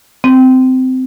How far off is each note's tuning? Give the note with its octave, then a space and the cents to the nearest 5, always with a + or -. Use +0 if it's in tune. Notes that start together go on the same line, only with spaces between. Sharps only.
C4 -20